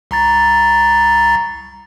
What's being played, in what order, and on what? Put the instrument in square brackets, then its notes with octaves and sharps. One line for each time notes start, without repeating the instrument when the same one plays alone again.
[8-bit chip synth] C2 A#5 A6